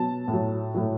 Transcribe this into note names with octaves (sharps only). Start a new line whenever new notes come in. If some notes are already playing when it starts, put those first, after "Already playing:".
Already playing: B2 F#3 A5
A2 F#3
A2 F#3